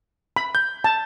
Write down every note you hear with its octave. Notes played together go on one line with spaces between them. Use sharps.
B5
G6
A5